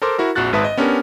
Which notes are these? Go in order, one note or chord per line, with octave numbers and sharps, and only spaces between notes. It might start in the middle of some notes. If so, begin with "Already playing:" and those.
A4 A#4 C5 C6 D6
E4 F#4 A#4
A#1 F2 F#4 F#6 A6
G#1 G#2 B4 E5 A5 D#6
D#5
B3 C#4 D4 G4 A#4